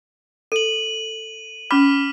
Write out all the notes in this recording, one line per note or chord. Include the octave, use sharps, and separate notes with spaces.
A4 D#7 F#7
C#4 B5 D6 F6 B6